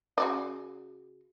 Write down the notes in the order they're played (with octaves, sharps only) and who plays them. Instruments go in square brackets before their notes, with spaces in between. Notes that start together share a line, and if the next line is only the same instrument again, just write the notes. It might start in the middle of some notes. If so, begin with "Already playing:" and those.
[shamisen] C#3 F#4 D5